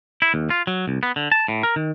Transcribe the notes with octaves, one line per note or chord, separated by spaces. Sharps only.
E4
D#2
F4
F#3
C2
B3
D3
A5
A2
A#4
D#3